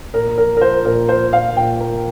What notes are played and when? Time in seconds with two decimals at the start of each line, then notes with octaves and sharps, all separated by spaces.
0.14 A#2 A#4
0.37 F3 A#4
0.57 A#4
0.61 F3 C5
0.85 A#2 A#4
1.08 F3 C5
1.33 A#2 F5
1.56 A#2 G5
1.80 A#3